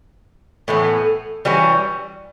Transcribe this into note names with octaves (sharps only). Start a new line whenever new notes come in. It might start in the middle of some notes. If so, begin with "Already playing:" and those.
A2 E3 B3
E3 G3 C#4 F#4